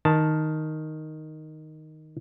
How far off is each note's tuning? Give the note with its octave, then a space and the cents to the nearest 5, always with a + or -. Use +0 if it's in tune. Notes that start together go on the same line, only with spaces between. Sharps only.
D#3 +0 A5 +0